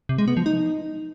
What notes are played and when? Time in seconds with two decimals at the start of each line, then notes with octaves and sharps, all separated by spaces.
0.09 C3
0.18 G#3
0.28 B3
0.37 F3
0.46 D#4